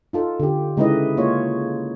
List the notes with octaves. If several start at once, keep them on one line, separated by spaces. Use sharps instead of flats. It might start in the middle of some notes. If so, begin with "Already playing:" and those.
D#4 F4 A4
D3 G4
C#3 G#3 D#4 E4 B4 D#5
A#3 F4 C#5